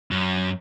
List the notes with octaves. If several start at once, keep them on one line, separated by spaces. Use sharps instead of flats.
F#2